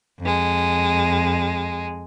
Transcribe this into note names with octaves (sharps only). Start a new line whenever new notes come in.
F2 G#3